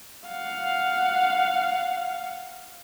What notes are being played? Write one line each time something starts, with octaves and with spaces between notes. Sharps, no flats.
F5 F#5